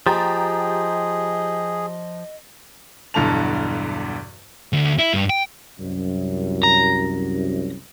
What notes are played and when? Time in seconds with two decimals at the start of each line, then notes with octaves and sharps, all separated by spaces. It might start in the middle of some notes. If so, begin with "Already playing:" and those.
0.06 F3 G4 G#4 D#5 A#5 A6
3.14 B1 E2 G2 D3 A5 F7
4.73 D2
4.99 E4
5.14 G2
5.30 G5
5.79 C2 F#2
6.63 A#5